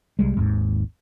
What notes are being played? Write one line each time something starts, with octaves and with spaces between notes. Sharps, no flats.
C2 G3 G#3
G#1 D#2 G#2